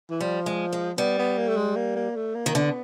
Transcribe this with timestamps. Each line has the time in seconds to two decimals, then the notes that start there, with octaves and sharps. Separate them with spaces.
0.10 E3
0.20 F3 G3
0.46 G#3
0.73 G#3
0.98 G3 B3
1.18 B3
1.38 A#3
1.48 A3
1.57 G#3
1.76 A#3
1.96 A#3
2.16 A3
2.35 A#3
2.46 D#3
2.54 D3 B3